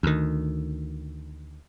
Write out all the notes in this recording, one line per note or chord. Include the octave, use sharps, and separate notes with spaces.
D2 D#3